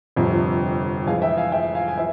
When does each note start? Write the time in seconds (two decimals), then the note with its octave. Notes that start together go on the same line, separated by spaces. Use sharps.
0.16 G1 F2 C3 F3
1.07 F2 E3 G#3 F5 G#5
1.22 E5 G5
1.37 F5 G#5
1.52 E5 G5
1.75 F5 G#5
1.88 G#5
1.97 E3 E5